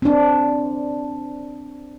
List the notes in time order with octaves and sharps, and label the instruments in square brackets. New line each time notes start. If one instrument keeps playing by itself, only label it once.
[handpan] C4 D4